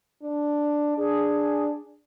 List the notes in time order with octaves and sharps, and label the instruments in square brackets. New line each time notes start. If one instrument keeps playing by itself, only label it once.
[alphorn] D4
[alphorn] D4 [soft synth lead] G#4